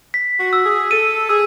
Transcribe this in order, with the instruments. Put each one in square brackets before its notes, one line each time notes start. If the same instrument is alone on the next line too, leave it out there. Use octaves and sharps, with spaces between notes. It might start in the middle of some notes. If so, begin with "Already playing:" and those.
[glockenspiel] B6
[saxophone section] F#4
[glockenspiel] E6
[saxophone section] G#4
[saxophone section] A4 [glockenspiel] D#7
[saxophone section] G#4 [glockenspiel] E6